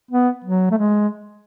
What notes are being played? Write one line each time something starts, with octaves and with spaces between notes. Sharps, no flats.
B3
F#3
A3
G#3